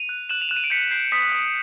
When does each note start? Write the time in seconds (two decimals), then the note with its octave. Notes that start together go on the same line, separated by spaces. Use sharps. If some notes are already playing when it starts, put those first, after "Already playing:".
Already playing: D#7 F7
0.09 F#6
0.29 F#6 E7 F#7
0.41 F7
0.49 F#6 E7
0.57 D#7
0.64 D7
0.70 G6 B6 C#7
0.91 G6 C7
1.12 D#6 B6 C#7
1.32 D#6